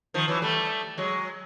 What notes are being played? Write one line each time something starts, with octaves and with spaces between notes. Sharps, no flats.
D#3 F3
E3 F#3
G3 A3
F#3 G#3